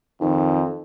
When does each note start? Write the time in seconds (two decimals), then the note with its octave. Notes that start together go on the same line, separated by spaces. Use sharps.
0.21 F2 D#3